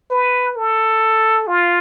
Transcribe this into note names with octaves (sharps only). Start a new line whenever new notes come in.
B4
A4
F4